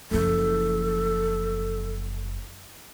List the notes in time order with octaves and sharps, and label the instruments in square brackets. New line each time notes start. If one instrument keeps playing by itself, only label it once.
[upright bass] F#1 F3 [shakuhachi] A4